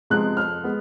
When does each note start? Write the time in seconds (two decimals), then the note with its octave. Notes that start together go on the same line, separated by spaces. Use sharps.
0.10 C3 F3 G#3 B3 F#6
0.37 F2 F6
0.64 G#3 B3